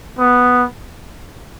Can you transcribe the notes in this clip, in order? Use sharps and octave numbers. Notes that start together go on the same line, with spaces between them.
B3